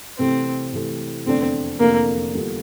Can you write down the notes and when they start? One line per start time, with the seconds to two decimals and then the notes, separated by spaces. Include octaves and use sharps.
0.19 C3 E3 A3 C4
0.73 C3 E3 A3
1.26 F1 E2 D3 A3 C4 D4
1.80 F1 E2 D3 A3 A#3 D4
2.33 E2 D3 G3 D4 F4